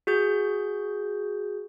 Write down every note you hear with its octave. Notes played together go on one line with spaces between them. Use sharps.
F#4 G#4 G6